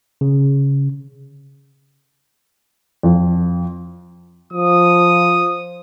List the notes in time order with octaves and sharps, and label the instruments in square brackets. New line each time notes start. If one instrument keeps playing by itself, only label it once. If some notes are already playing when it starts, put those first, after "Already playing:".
[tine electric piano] C#3
[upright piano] F2
[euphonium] F3 [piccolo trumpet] D#6